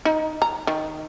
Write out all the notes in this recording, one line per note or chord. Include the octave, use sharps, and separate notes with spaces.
D#4
A#5
D#3